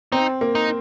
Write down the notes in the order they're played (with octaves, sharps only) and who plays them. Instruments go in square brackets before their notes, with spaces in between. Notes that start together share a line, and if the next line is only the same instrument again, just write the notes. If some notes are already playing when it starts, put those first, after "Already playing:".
[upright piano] C4 [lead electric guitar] D#4
[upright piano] A#3
[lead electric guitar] D#4